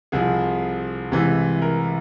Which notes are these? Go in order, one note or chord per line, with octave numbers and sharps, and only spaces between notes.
C2 C3 F3 G#4
C2 C3 E3 G#3
A#4